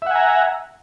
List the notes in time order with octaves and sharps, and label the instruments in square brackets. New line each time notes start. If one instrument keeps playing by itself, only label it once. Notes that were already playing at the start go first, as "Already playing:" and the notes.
[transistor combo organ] E5
F#5
G#5
A#5